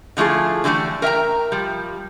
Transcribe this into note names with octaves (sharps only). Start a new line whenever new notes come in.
D3 F3 A3 E4 G#4
D3 E3 G3 A3 D4
A#4 E5 G5 A#5
F3 G3